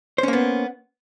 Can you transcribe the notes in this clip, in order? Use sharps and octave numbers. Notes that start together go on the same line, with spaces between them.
A#3 B3 C#4 C5